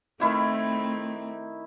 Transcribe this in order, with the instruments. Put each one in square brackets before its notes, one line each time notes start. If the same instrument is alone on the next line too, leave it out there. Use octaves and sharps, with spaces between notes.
[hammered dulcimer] D#3 E4 G4 [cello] A3 C4